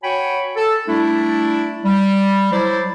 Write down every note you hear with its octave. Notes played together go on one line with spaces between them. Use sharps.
F#4 C#5 G5 G#5 B5
A4
G3 A3 D4 E4
G3
F#3 E4 C5 D5